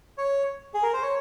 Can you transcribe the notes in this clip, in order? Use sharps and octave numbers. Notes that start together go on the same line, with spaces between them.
C#5
G#4
A#4
C5
C#5